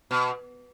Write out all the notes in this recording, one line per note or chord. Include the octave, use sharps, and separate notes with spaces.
B2